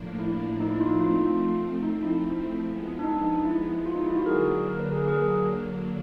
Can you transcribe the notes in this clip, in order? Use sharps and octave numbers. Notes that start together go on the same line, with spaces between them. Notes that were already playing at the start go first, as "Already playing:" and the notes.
Already playing: A2 F3 A#3 D4
E4
D#4
E4
F4
D#4
F3 A3 C4 F4
F4
D#4
E4
F3 G#3 B3
D4
D#4
E4
F4
D#4
E4
F#4
D3 F#3 A#3 D4 G#4 A#4
A#4
B4
G#4 A#4
G#4 A#4